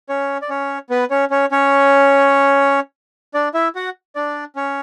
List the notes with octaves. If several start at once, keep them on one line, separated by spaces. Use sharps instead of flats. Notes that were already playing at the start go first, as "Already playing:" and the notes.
C#4 C#5
D5
C#4 C#5
B3 B4
C#4 C#5
C#4 C#5
C#4 C#5
D4 D5
E4 E5
F#4 F#5
D4 D5
C#4 C#5